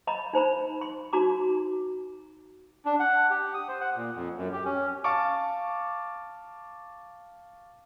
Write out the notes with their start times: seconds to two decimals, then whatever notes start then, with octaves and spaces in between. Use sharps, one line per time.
0.07 D#5 A#5 B5
0.33 D#4 C5 A#5 B5
0.81 C6
1.13 D#4 F#4 A#5 D6
2.85 D4
3.00 F#5
3.30 G4
3.54 D#6
3.68 C5
3.81 F#5
3.96 A#2
4.15 F2
4.37 F#2
4.53 G4
4.65 C#4
5.04 F5 A5 C#6 D6